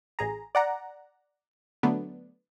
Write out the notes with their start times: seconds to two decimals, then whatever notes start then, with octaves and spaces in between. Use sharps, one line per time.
0.19 A1 G#4 A#5
0.55 D5 F#5 A#5
1.83 D3 F#3 A3 B3 D4